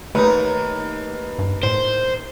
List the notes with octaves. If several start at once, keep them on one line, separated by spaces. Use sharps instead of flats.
D#2 A3 D#4 B4
G2
A2 C5